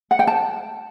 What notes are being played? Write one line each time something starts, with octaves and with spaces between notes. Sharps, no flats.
F#5
G5
A5